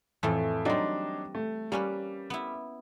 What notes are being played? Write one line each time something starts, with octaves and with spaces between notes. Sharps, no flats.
F2 A2 E3 A3
F#3 G3 C4 D4 D#4
A3
G3 A#3 C#4 B4
B3 E4